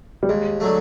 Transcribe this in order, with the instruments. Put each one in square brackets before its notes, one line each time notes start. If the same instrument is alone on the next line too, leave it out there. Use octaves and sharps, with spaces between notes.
[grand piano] G3
[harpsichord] D#2 [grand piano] G#3
[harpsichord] D3 F#3 A3